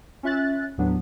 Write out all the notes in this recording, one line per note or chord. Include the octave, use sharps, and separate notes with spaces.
C#4 F4 E5 F#6 A6
D#2 A2 F#3 B3 D4